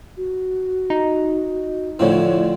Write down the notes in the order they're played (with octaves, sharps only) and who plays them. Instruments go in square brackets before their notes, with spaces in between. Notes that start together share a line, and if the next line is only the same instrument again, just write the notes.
[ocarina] F#4
[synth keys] D#4
[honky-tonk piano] A2 C#5 [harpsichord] D3 F3 C4 [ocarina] D5